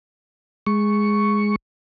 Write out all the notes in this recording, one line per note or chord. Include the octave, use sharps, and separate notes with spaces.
G#3 C#6